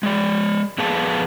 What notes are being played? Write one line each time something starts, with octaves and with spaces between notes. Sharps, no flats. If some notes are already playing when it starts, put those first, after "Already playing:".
G#3 D5
F2 B3 G#4 F5 A5